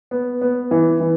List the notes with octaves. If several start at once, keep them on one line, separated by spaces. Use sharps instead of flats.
B3
B3
E3
E3